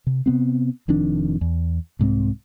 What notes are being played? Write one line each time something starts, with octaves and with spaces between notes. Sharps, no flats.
C3
C3 B3 C4
F1 F2 D#3 D4
E2
C2 G#2 G3 C4